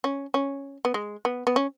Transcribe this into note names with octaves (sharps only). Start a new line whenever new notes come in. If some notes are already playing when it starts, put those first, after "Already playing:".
C#4
C#4
B3
G#3
B3
B3
C#4